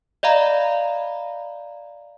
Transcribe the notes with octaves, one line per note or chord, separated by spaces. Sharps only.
D5 D#5 F5 A#5 B5